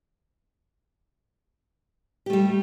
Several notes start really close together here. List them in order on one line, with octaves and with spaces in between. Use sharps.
G4 A3 G3